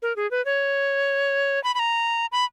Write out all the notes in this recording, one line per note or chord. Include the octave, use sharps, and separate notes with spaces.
A#4
G#4
B4
C#5
B5
B5
A#5
B5